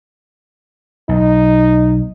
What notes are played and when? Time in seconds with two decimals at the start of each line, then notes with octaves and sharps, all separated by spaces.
1.09 B1 D#4